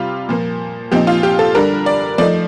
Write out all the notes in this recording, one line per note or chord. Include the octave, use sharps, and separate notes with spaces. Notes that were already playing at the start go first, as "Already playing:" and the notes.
Already playing: C3 G3 F4
A#2 F3 A#3
A#2 F3 C4 D#4 G4
F4
G4
A4
D3 G3 D4 A#4
D5
F3 A3 D#4 D5